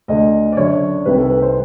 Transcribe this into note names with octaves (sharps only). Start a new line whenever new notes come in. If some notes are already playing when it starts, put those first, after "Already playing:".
D2 D3 D#5
D5
F#2 D3 C#5
C2 C3 D#3 B4
A4
B4
C5